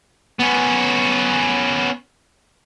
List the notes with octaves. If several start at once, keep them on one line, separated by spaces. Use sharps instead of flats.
B3 C#4